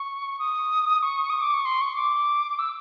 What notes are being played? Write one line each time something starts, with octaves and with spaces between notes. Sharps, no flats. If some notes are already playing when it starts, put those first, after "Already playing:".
Already playing: C#6
D#6
C#6
D#6
D6
C#6
C6
C#6
D6
E6